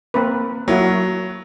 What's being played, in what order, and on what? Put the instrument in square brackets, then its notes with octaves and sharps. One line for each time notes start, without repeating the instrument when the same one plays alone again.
[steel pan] A#3 C4 B4
[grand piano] F#3 [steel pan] A#3 E4 F#4